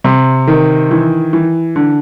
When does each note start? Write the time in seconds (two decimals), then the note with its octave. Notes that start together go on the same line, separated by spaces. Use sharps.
0.04 C3
0.47 D#3
0.91 E3
1.33 E3
1.76 D3